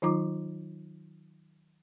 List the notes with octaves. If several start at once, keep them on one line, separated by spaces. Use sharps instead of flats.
D#3 F#3 D#4 F4 A#5 D6